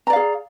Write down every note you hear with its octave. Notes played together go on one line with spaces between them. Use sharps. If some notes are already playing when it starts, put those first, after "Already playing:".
G#4 D5 F5 A#5